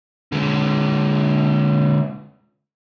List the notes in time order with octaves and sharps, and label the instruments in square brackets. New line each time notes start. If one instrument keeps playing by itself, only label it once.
[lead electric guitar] D3 G#3